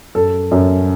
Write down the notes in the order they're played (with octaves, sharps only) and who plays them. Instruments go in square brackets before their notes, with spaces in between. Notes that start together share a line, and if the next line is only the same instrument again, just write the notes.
[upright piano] F#2 A4
F#2